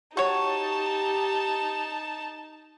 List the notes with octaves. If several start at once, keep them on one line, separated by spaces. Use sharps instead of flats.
D#4 F#4 G4 C#5 A5